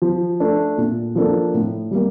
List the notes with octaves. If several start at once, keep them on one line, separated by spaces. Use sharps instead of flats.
F3
A3 D4
A#2
F3 A#3 D4 A4
A2
G3 A#3